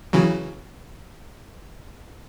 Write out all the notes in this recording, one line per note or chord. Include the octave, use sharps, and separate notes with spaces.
C#3 E3 F#3